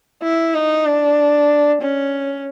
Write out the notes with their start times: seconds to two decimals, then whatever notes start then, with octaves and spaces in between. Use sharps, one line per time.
0.23 E4
0.54 D#4
0.86 D4
1.81 C#4